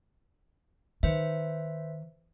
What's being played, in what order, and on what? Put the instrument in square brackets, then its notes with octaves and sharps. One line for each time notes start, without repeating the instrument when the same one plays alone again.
[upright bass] D#3 [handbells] B4 C5 E5